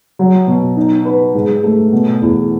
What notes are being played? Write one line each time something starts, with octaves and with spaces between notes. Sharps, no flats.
F#3
B2
D#4
B4
G#2
A3
B2
E2